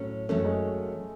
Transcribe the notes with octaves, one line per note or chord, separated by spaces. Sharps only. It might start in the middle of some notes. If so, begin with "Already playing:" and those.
Already playing: A2 F#3 A3 C#4
F#2 D#3 F#3 A3 C#4
G#3